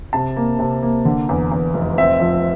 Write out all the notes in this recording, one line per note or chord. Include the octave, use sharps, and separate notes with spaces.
C3 A5
A#3
C3
A#3
D3
E2
E2
F1
C4 E5
F3